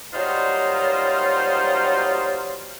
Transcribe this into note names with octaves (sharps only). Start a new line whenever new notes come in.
F#3 G3 A#3 D#4 F4 C5